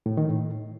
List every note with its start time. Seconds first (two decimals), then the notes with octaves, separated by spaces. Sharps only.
0.06 A2
0.17 D#3
0.29 A2